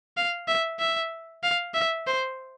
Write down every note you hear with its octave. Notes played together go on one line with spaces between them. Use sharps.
F5
E5
E5
F5
E5
C5